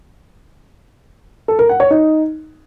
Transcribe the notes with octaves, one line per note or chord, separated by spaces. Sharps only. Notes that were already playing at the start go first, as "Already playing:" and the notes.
A4
A#4
F#5
C#5
D#4